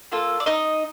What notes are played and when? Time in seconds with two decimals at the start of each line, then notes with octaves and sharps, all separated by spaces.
0.12 A#3 F4 A4
0.40 D5
0.46 D#4 D#5